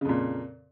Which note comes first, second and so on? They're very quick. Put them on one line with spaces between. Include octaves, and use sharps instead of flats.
C#3 F2 A#2